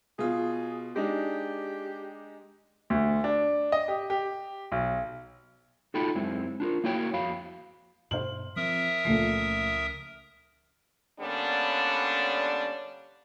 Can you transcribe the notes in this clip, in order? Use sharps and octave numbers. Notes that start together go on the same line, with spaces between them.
B2 F4 G#4
G#3 D4 D#4 G4
D2
D4
D#5
G4
G4
B1
D#4 F4 F#4 A4 G5 B5
F#2 G#3 C4 E4
D4 F4 G4 A#4
A#3 E4 F#4 C#5 G5
F2 F#4 F5 B5
G2 B2 C5 F6 F#7
F3 C4 A#4 E5 D#6
C#2 A#2 C#3 F3 A3 C7
D3 G3 A#3 B3 C#4 D4